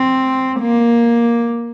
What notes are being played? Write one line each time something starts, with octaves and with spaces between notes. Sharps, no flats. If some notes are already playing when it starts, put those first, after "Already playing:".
Already playing: C4
A#3